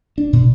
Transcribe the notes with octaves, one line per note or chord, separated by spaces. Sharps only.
D4
B2